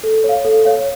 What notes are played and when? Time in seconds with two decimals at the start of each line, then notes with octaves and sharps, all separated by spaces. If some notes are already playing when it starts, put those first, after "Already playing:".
0.04 A4
0.24 C#5
0.29 F5
0.45 A4
0.65 C#5 F5